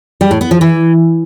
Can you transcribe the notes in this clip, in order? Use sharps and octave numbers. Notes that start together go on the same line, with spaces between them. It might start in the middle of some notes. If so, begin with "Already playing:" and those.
G3
A2
B3
F3
E3